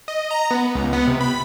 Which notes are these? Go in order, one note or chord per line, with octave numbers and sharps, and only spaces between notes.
D#5
A#5
B3
C#2
B3
C3
B5